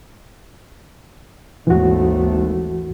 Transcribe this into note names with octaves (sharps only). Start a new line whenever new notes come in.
G#1 D#2 E3 A3 F#4